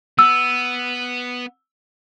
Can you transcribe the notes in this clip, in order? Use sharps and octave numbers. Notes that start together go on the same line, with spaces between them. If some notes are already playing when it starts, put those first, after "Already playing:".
B3 E6